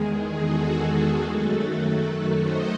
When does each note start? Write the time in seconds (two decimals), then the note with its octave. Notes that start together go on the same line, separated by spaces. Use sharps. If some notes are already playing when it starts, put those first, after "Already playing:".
Already playing: E2 D#3 G#3 G#4
0.40 F#4 A4
1.25 F#2 D#3 F#3 A3 F#4 A4
2.39 C5 D#5